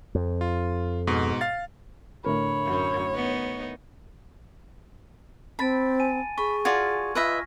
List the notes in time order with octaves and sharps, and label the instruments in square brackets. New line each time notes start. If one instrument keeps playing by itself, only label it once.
[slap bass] F2
[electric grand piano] F4
G#2 B2
F5 A6
[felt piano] A2 D3 A#4 [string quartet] C#5 [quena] B5
[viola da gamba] F#2
B3 D#4
[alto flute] C4 [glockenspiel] A5 A6 D7 [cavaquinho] B5
[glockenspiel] G#5 D#7
[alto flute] G#4 [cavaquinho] B5 [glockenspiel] C#6
[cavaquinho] F4 F#4 D5 [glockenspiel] G#6
[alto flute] F4 [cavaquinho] B4 D#5 E5 [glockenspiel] F6 A#6 B6